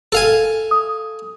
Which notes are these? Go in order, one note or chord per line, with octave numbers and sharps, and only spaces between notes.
A4 F5 G#5
D#6